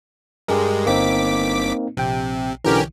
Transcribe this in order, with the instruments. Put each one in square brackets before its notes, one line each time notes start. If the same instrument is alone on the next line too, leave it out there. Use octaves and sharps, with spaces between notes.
[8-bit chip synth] G2 G#3 [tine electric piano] G4 G#4 A#4
[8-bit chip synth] G1 D6 B6 [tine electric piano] A#3 C4 D#4
[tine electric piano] A#1 G5 [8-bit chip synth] C3
[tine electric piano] B1 D3 E3 [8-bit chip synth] C#4 G4 A#4